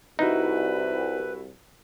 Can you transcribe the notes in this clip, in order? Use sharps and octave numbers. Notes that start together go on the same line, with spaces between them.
C2 D#4 E4 F#4 B4